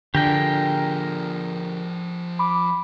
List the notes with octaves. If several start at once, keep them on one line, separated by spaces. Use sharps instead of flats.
D3 F3 G4 G#4 A#4 G5
B5 D6